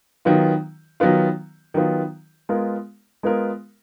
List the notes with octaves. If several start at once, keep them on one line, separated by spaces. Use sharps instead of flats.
D#3 F#3 B3 F4
D#3 F#3 B3 F4
D#3 F#3 B3 F4
G#3 B3 F4 A#4
G#3 B3 F4 A#4